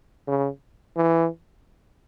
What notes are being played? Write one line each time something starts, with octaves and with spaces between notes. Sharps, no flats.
C#3
E3